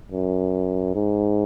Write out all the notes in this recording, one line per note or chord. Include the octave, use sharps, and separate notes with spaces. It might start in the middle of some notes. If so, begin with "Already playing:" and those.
F#2
G#2